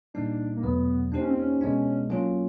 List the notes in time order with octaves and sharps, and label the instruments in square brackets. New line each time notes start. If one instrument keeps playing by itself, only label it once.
[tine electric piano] A#2 G3 A#3 D#4 [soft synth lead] D4
[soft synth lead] A#3
[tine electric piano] E2 B2 F#3 A3 [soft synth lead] B3
[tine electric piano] A#3 D#4 G4 C5 [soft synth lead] D4
[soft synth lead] C#4
C4
C#4
[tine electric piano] B2 G#3 B3 D4 [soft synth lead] C#4
[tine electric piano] F#3 A#3 C#4 F4 [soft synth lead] D4